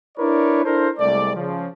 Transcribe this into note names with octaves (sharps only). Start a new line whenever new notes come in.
D4 E4 A#4 B4 C#5 D5
D4 E4 A4 A#4 C5
C2 G#3 A3 D5
C#3 F3